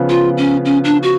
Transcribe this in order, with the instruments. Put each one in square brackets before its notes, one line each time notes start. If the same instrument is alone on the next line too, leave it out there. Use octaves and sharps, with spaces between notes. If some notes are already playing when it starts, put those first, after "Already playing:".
Already playing: [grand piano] C#3 F3 B3
[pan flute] F4
C#4
C#4
D4
F#4